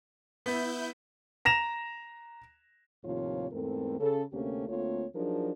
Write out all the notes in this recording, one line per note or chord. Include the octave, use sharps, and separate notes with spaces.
B3 E4 G6
A#5 A#6 E7 F7
D#2 A2 C3 F3 F4 C#5
E2 G#2 A3 C4 A4 A#4
C#3 A4
D2 C3 A3 A#3 C#4 G4
D2 A3 A#3 C4 F4 C#5
F3 F#3 D4 D#4 G#4 A#4